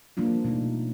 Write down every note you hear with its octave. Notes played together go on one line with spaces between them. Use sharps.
F3 G3 A#3 D4 F4
B2 F3 A3 D#4